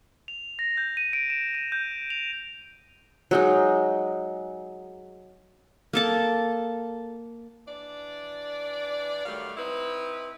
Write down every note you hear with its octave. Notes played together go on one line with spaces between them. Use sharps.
F7
A#6
G6
D#7
D7
E7
D#7
G6
F7
F#3 G#3 D#4
A#3 A4 A5
E3 D4 D5
D#3 F#3 G3 A3 F5
C4 D#4 E4 B4